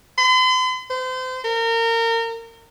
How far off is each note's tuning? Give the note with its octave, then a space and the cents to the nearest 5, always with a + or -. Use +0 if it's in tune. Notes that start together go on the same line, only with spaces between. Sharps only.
C6 -45
C5 -35
A#4 -30